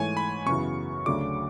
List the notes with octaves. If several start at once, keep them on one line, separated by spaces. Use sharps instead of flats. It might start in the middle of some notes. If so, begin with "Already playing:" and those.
Already playing: G#2 E3 A3 C#5 G#5
B5
F#2 C#3 E3 B3 F#4 C#6
D2 C#3 F#3 A3 D4 D6